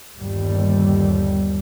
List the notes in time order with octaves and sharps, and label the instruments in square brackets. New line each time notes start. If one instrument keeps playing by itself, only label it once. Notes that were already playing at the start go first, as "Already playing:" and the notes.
[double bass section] G1 D#2 G3